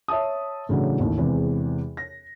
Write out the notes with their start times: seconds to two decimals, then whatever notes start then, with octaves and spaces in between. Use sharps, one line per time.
0.08 C#5 E5 A5 D#6
0.69 A2 C#3 E3 F#3 D4 E4
0.99 A1 D#2
1.18 E2 C3 E3 G#3
1.97 A#6